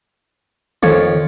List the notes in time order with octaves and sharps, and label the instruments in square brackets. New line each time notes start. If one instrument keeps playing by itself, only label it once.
[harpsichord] F2 C#5 [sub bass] D#3